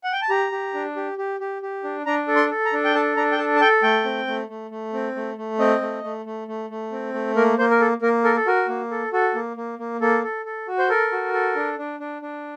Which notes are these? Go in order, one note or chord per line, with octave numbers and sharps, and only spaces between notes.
F#5
G5
A5
G4 A#5
G4
D4
G4
G4
G4
G4
D4
D4 A#5
A4
C6
A4
A#5
D4
G5
A4 A5
D4 A#5
G5
A4 A5
A5
A4 G5
A3 G5
C4
A3
A3
A3
C4
A3
A3
C4 D#5
A3
A3
A3
A3
A3
C4
A3
A#3 A#4
A#3 C5
A#4
A4
A#3 A#4
A4 A#4
A4
F#4 A#4
A#3
A4
F#4 A4
A#3
A#3
A#3
A#3 A4
A4
A4
F#4
C5
A4 A#4
F#4
A4
D4
D4
D4
D4